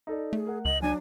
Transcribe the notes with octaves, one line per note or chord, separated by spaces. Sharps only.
D#4 A4 D5
A3 G#4
A#4 F#5
C#2 D#5 F#7
F#3 D4 G#5